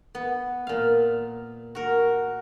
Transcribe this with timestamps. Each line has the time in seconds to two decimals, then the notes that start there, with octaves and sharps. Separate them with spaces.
0.15 B3
0.67 A#2 F5
1.75 F#4 A#4